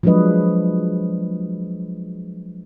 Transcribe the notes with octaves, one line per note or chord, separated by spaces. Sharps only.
F3 F#3 G#3 D4 B4 D#5